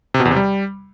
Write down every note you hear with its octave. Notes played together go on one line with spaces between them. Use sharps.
C3
B2
E2
C3
G3